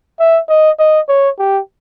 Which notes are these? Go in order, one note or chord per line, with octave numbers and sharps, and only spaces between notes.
E5
D#5
D#5
C#5
G4